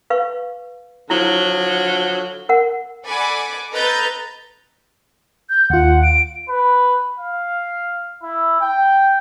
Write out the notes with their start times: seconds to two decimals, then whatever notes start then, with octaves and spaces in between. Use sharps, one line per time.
0.10 B4 F5 C#6
1.10 D3 F3 F#3 E4
2.49 A#4 F#5
3.05 A4 D5 F#5 G#5 B5 D6
3.71 A4 B4 D#5 A#5 G6 A6
5.49 G6
5.70 D#2 F4 F#5
6.03 D7
6.49 B4
7.18 F5
8.24 E4
8.61 G5